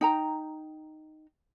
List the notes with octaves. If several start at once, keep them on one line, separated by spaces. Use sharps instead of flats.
D#4 G5 A#5